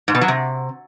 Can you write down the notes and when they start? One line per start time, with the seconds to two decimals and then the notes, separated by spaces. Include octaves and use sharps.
0.08 G#2
0.15 B2
0.21 F#3
0.28 C3